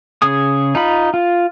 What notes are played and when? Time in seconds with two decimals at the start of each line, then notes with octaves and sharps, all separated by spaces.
0.22 C#3 G#4 D#6
0.75 D#4 F4 B5
1.14 F4